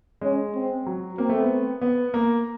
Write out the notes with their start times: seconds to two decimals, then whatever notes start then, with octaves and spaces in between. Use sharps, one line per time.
0.21 G#3 C#4
0.54 C4
0.86 F#3
1.18 A#3 C4
1.29 A3
1.40 B3
1.82 B3
2.14 A#3